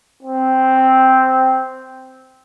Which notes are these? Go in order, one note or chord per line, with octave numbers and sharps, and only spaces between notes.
C4